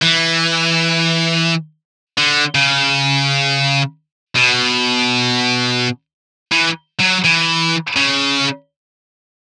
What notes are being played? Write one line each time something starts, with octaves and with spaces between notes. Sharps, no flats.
E3
D3
C#3
B2
E3
F#3
E3
C#3